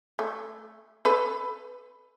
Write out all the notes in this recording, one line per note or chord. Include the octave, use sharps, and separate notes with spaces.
A3
A4 B4